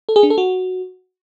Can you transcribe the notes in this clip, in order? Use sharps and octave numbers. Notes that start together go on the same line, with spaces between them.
A4
G#4
D4
A4
F#4